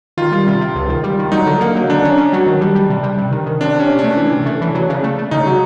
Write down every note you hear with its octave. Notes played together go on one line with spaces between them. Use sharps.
D#3 F4
G3
C3
C3
C#2
D#3
G3
D#3
F#3 D#4
D3
A#3
F#3
D3 D4
C#4
C#4
F#3
D#3
G3
G3
C3
G3
C3
D#3
D#3
C3 D4
C3 C#4
C3
A3 D4
E3
C3
A3
E3
F#3
C#3
A3
A3
C#3 D#4
F#3